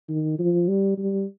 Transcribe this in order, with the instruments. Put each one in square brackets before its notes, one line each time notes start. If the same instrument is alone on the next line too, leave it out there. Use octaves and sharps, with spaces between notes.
[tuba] D#3
F3
G3
G3